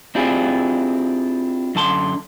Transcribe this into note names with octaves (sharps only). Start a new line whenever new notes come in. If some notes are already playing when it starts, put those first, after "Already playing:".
C4 D4 E4 F4 G4 G#4
F#2 D3 A5 C6